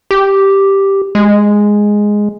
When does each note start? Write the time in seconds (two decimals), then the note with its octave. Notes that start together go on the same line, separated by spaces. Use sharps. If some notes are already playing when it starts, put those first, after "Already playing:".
0.11 G4
1.15 G#3